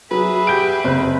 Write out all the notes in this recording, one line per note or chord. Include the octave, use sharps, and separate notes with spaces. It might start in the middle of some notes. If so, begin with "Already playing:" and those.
F#3 G#4 B4 E5
G4 G6 D7
F#1 C4